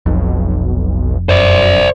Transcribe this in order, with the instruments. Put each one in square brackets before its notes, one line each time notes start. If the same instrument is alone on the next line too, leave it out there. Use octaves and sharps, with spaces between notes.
[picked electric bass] F1 F2 [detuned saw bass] B1
[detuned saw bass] F#2 [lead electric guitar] C5 D5